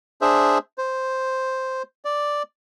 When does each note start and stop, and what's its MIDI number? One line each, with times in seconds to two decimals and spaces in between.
0.21 0.58 62
0.21 0.58 68
0.21 0.58 72
0.21 0.58 76
0.78 1.82 72
2.05 2.43 74